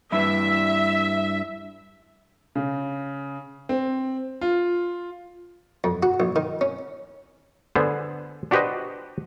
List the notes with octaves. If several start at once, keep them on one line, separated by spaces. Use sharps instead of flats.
G2 E4 E5
C#3
C4
F4
F2
F#4
A#1
D#3
C#4
D3 B3 G#4 C5
D4 F#4 G4 B4 C5 D#5